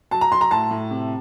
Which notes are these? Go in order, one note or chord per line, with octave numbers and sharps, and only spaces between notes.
F#3 A5
A#5
F#3 C6
A#5
A2 A5
A2
C3